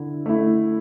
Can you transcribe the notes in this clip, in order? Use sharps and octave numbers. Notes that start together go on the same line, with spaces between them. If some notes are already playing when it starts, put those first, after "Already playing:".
Already playing: D3 E4
A3 E4